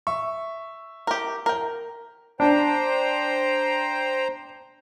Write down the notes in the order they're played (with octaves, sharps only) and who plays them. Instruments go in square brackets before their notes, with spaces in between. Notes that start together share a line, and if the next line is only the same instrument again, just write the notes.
[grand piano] E5 [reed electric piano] C#6
[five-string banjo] G4 A#4
A#4 G5
[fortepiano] D4 [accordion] C5 G5 A#5